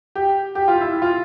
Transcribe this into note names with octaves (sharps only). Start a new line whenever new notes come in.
G4
G4
F4
E4
F4